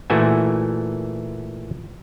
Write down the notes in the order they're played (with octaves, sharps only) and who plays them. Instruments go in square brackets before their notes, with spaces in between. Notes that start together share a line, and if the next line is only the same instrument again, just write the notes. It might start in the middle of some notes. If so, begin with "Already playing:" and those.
[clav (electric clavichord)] A#2 E3 A3 F#4 E5 G#5